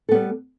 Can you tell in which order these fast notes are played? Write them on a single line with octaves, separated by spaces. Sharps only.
A4 B3 G3